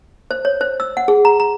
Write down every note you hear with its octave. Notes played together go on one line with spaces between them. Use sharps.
C5
C#5
C5
E6
F#5
G#4
A#5
A#5